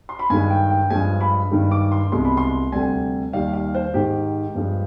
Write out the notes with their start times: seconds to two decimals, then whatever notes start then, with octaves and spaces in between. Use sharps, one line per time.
0.09 C6
0.19 B5
0.30 G2 D#3 G#3 G#5
0.50 G5
0.70 G5
0.90 G2 F3 G#3 G#5
1.21 B5
1.51 G2 D#3 G#3
1.71 D6
1.92 C6
2.12 C2 B2 G#3 C6
2.25 B5
2.37 C6
2.72 D2 C3 G3 G#5
3.33 D#2 D#3 G3 F5
3.53 F5
3.74 C5
3.94 G#2 D#3 G#3 G4
4.55 G2 F3 G#3